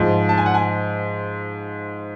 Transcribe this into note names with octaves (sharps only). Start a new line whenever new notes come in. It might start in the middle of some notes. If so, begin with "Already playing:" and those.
Already playing: G#2 F3
A5
G#5
F#5
G#5